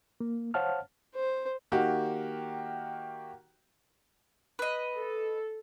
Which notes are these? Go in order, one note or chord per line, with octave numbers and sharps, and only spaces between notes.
A#3
C5 C#5 F5 F#5 A5 F6
C5
D#3 A#3 F#4 G4
B4 D#5
A4